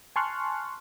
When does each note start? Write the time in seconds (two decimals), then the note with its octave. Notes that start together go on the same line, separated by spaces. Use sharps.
0.16 G#5 A5 C6 C#6 F6 F#6